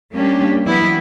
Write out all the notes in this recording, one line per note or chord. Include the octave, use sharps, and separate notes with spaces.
G3 A#3 C#4 D4 G4
E3 F#3 G3 B3 E4